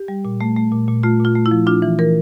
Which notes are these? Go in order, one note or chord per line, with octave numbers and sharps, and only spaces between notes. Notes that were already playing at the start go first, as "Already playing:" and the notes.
Already playing: G4
G3
A#2
A3
A3
A#2
A#2
A3 F4
A#2
F4
A3
E4
F3
D4 F4
E3
E3 A#4